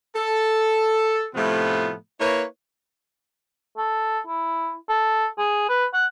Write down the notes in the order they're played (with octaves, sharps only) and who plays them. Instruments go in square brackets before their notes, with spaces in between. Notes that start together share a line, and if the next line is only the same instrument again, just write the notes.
[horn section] A4
A2 C3 F3 A3 B3 F4
A#3 E4 B4 C#5
[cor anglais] A4
E4
A4
G#4
B4
F#5